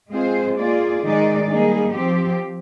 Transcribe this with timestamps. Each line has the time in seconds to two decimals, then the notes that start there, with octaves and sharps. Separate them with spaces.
0.11 G#3 C4 F4 G#4 C5
0.57 A#3 F4 G#4 D5
1.02 D#3 G#3 D#4 G#4 D5
1.48 G3 A#3 D#4 G#4
1.94 F3 C4 G4